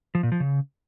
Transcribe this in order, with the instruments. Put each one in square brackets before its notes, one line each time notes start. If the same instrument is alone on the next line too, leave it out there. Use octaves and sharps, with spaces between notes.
[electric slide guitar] F3
A#2
F3
C#3